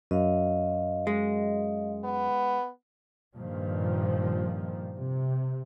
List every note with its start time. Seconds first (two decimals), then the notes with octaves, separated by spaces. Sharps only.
0.11 F#2 D#5 F5
1.07 G#3
2.04 B3
3.36 G2 A#2 D#3 F3
4.96 C3